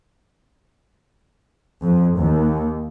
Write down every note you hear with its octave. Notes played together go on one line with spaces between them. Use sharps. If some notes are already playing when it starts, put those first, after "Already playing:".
F2
D#2